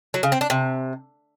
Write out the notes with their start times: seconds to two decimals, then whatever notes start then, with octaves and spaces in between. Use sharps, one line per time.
0.14 F#3
0.23 C#3
0.32 C4
0.41 D4
0.50 C3